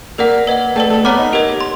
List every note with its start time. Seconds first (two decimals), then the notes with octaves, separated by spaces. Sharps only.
0.18 A#3 A#4 D5 F#5
0.47 B4 D#5 F#5
0.76 A3 B4 D5 G5
0.90 A3
1.04 B3 C#5 F#5 A#5 D6 F6
1.18 D#4
1.33 G4 A#4 D#5
1.61 C6